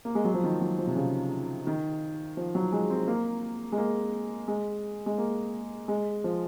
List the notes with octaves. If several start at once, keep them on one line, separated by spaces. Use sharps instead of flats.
A#3
G#3
F#3
F3
D#3
F#3
F3
C3
C#3
D#3
F3
F#3
G#3
C4
A#3
G#3
A#3
G#3
G#3
A#3
G#3
F3